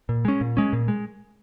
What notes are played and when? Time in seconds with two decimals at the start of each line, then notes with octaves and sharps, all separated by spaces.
0.09 A#2
0.25 G#3 C#4
0.41 A#2
0.57 G#3 C#4
0.73 A#2
0.88 G#3